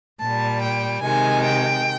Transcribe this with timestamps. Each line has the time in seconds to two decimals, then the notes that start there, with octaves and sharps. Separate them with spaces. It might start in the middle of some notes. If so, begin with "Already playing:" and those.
0.21 A#2 G3 A5
0.62 G5
1.02 C3 D#3 G#3 G#5
1.43 G5